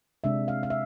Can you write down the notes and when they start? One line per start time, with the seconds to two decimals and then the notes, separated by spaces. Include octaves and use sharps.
0.24 C3 G#3 D4 E5
0.48 F5
0.63 F5
0.70 E5